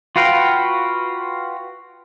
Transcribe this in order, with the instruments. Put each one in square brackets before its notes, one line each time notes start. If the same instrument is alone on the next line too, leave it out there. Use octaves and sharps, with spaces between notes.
[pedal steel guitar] F4 F#4 B4 F5 G5